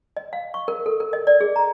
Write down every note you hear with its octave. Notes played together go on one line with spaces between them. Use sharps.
D#5
F5
C#6
A#4
A4
A#4
D#5
D5
G#4
A#5